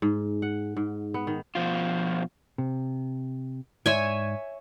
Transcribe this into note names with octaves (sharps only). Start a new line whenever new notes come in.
G#2
F#5
G#2
B3
D#3
B2 F3 F4
C3
G#2 C#5 D5 E5 G#5 C6